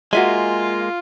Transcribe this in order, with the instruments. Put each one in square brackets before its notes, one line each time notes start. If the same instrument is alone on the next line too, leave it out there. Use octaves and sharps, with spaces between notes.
[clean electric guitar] G#3 A#3 [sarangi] F4 [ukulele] F#4 E5 G#5 [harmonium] F5